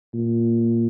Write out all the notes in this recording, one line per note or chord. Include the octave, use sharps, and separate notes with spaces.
A#2